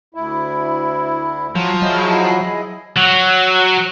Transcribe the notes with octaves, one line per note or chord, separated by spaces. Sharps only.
D2 E4
F3 F#3
F#3 E4 G#4 D#5
F#3